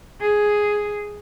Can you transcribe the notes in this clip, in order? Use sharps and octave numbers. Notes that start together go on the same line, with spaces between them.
G#4